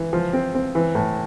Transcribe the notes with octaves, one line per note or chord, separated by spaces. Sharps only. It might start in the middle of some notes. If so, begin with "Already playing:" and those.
Already playing: E3
F3
C4
C4
E3
A2